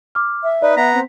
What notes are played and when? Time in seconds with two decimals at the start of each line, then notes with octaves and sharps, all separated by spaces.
0.15 D6 F6
0.43 E5
0.62 D#4 B4 D5
0.77 B3 E5 A#5 B6
0.93 C4